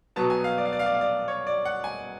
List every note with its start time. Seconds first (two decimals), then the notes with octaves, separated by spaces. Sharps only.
0.16 B2 F#3 B3 A5
0.30 G#5
0.44 F5
0.58 D5
0.65 F5
0.73 D5
0.79 F5
0.86 D5
0.94 F5
1.01 D5
1.28 C#5
1.47 D5
1.65 F#5
1.84 G#5